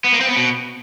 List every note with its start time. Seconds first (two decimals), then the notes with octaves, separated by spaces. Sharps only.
0.04 B3
0.12 A#3
0.21 C4
0.29 B3
0.37 B2